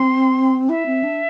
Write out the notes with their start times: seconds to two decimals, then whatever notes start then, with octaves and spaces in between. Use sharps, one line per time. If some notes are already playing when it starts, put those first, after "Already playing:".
Already playing: C4 C6
0.69 E4 E5
0.86 C4
1.04 D4